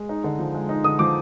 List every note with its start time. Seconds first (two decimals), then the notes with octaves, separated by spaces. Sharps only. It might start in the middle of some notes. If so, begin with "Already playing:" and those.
Already playing: G#3
0.09 D#4
0.24 D3
0.39 F3
0.54 G#3
0.69 D#4
0.84 D3 D#6
0.99 F3 D6